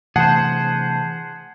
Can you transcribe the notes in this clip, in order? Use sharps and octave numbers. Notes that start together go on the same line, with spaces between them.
C3 E3 A3 G#4 C5 F#5 A5